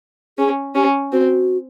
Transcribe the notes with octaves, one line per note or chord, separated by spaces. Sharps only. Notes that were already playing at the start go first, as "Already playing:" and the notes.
C#4 G#4
C#4 G4
C4 F#4